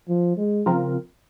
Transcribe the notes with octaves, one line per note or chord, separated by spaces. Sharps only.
F3
G#3
C#3 F3 C4 F4 A#4